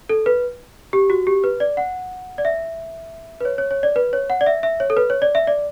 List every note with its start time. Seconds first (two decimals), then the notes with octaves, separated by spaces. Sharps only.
0.09 A4
0.26 B4
0.93 G4
1.10 F#4
1.27 G4
1.44 B4
1.60 D5
1.77 F#5
2.38 D5
2.45 E5
3.41 B4
3.45 C#5
3.58 C#5
3.71 C#5
3.83 D5
3.96 B4
4.13 C#5
4.30 F#5
4.41 D5
4.46 E5
4.63 E5
4.80 C#5
4.90 A4
4.97 B4
5.10 C#5
5.22 D5
5.35 E5
5.47 D5